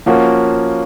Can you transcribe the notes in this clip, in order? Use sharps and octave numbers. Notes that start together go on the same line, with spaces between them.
F3 A#3 C#4 F#4